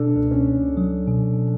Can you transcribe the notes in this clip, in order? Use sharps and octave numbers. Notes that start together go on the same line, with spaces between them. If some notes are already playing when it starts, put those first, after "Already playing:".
Already playing: B2 D4 A4
C#2
C#4
C#2
F#3
B2